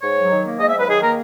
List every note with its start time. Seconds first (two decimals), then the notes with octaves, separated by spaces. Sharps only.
0.02 G#2 C#5
0.17 F#3
0.31 D#3
0.45 A#3
0.59 G#2 D#5
0.69 E5
0.74 F#3
0.79 B4
0.88 D#3 G#4
1.02 A#3 A#4